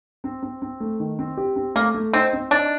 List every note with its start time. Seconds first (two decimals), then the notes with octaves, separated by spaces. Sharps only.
0.24 C4
0.43 C4
0.62 C4
0.80 A3
1.00 D#3
1.19 C4
1.37 G4
1.56 C4
1.75 A3 A#3
1.94 A3
2.13 C4 D#4
2.33 C4
2.51 D4 D#4